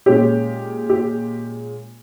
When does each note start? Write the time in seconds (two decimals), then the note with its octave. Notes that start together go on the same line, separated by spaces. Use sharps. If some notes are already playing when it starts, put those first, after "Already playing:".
0.06 A#2 G#3 C#4 G4
0.90 G4